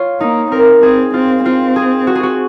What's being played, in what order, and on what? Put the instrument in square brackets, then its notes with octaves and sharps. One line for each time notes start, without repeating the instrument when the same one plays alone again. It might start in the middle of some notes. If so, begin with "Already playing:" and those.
Already playing: [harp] F4 C#5
[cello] A#3 [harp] D#4
[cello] C4 [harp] A#4
[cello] C4 [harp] G#4
[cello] C4 [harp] F4
[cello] C4 [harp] F4
[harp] G#4
F#4
G#4
F#4